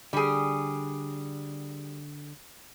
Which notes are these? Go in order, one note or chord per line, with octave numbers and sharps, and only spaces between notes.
D3 G3 G#4